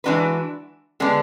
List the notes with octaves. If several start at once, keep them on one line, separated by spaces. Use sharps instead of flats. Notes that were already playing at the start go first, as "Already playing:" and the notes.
E3 G#3 D4 F#4 B4
D3 G#3 B3 D4